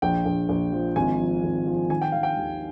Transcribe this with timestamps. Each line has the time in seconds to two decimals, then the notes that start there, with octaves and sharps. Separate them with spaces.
0.02 A#1 G5
0.25 A#1
0.49 A#1
0.73 F3
0.96 G#1 G#5
1.19 F3
1.43 G#1
1.67 F3
1.90 D#3 G#5
2.01 G5
2.12 D#3 F5
2.23 G5
2.37 D#2